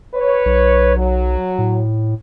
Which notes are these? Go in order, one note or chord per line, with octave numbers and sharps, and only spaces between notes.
B4 C#5
B1
F#3
A2